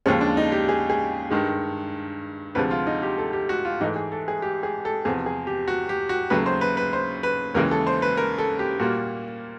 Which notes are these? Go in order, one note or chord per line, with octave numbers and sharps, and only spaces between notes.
D#2 C#3 F3 G#3 C#4
D4
D#4
G4
G#4
G#4
G2 D#3 G#3
D2 C3 F3 G#3 B4
F4
D#4
G4
A4
G4
F#4
F4
G#2 E3 A3 D#4
G#4
A4
G#4
G4
G#4
A4
E2 C3 F3 G#4
G#4
G4
F#4
G4
F#4
D#2 C#3 F#3 A3 B4
C5
B4
B4
C5
B4
D#2 C#3 E3 G#3 A#4
A4
C5
B4
A#4
A4
G4
A#2 G3 A#3 F#4